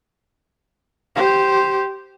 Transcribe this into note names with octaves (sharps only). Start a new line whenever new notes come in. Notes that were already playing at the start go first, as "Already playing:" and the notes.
G4 C5